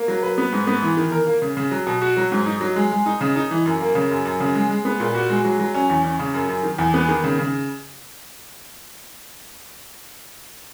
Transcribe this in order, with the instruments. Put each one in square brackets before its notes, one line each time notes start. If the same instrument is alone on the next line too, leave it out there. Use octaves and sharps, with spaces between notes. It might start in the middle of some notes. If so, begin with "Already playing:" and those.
Already playing: [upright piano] A#3
F#3
B4
B3
G#2
B3
E3
D#3
A#4
A#3
C#3
C#3
F#3
B2
F#4
F#3
G#2
D#4
F#3
G#3
G#3
D#4
C#3
D#4
E3
F#2
A#3
C#3
F#2
F#2
C#3
G#3
G#3
B3
A#2
F#4
G#3
F#3
F#3
C#4
E2
C#4
C#3
F#2
F#2
D#3
E2
B3
D#3
C#3
C#3